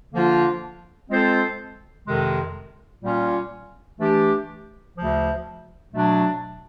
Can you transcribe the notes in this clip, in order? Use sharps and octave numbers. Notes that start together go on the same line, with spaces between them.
D3 F3 A#3 D4 F4
G#3 C4 F4 A4 C5
F2 C3 D#3 G#3
A#2 G3 A#3 C#4 F4
E3 A3 D4 G4
D2 C#3 F3
B2 F#3 A3 D4